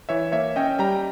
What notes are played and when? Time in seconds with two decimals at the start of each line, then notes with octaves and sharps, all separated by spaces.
0.09 E3 C#5 E5
0.32 A#3 C#5 E5
0.56 C#4 D#5 G5
0.79 G3 G5 A#5